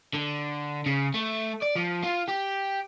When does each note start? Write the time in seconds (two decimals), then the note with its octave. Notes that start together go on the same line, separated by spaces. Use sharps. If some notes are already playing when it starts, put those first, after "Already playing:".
0.14 D3
0.86 C#3
1.14 A3
1.62 D5
1.75 F3
2.03 F4
2.28 G4